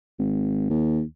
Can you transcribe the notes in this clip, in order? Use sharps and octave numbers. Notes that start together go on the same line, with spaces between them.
G#1
D#2